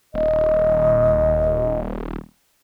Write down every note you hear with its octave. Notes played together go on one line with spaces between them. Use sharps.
D#1 D#5